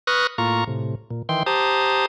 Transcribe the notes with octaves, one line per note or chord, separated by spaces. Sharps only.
B4 C#6 D#6 F6 F#6 A#6
A2 A#3 F4 A#5 C#6
A2 C3
A#2
D#3 E3 G5 C6
G4 C5 A5 A#5 D#6